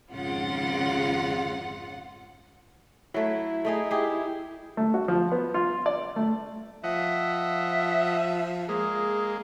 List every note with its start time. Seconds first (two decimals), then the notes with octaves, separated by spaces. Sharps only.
0.11 G#1 F2 C#3 F4 F#5
3.14 F#3 A3 E4
3.65 A3 D#4 G#4
3.91 G4 G#4
4.77 A3
4.94 F#4
5.08 F3
5.32 B3
5.54 F4
5.86 D5
6.16 A3
6.84 F3 D#5 E5 F#5
8.69 G#3 A#3 G#4